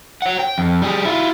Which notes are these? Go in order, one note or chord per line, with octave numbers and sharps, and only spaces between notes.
C#5 F#5
G5
F2
G3 G#4
E4 F4